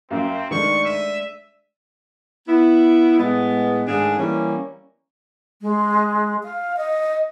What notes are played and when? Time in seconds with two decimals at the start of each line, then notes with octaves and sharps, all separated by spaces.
0.10 F#2 A#3 C4
0.51 D#3 G#3 A3 D4 C#6
0.85 E5 D#7
2.48 B3 E4
3.19 A2 G#3 B3
3.87 G#2 D#3 A3 D4 G#4
4.18 E3 G3 A#3 C#4
5.62 G#3
6.44 F5
6.77 D#5